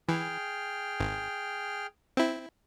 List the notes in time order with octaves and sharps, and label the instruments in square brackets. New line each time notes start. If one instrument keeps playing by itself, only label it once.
[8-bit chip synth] E3 [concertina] G#4 G5 F6
[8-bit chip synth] G#1
C4 E4